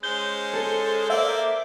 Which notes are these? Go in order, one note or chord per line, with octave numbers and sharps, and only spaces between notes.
G#3 C#4 C5 G6 G7
A4
A#3 C5 D5 E5